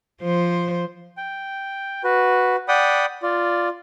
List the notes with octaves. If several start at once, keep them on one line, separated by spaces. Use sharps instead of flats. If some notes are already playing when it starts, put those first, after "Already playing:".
F3 C5
G5
F#4 B4
D5 F#5 G5 B5 D#6
F4 D5